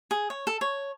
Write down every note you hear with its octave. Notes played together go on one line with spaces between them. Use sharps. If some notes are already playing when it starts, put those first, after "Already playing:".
G#4
C#5
A4
C#5